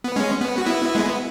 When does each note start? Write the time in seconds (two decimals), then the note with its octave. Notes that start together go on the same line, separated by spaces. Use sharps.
0.04 B3
0.16 G#3 C#4
0.41 B3
0.58 F#4
0.67 B3 E4
0.95 G#3
1.06 B3